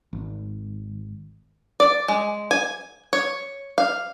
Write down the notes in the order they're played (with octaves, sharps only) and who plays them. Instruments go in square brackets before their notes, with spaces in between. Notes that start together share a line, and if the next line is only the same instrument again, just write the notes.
[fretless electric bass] G#1
[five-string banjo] D5
G#3
G#5
C#5
F5